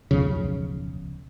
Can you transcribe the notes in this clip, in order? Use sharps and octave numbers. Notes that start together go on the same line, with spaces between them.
D1 B1 F2 C#3